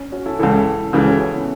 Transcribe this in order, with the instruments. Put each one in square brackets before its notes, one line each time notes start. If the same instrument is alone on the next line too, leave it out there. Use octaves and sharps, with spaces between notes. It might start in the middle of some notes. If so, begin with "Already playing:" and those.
Already playing: [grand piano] C#4
C#4 F#4
E4 A4
[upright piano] C#2 C#3 E3 [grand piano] E4 A4
[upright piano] C#2 C#3 E3 [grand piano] E4 A4
[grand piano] C#4 F#4
C#4
B3 E4